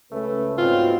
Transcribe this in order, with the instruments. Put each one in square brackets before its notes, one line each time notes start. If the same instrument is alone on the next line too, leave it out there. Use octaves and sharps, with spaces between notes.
[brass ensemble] C#2 C#4 B4 [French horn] A3
[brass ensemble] G#2 B2 [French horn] C4 [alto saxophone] F4